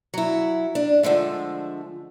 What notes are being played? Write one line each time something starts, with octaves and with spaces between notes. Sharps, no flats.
F#3 E4
D4
D3 F3 G#3 A3